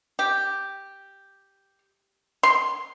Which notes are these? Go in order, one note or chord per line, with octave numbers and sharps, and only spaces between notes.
G4
C6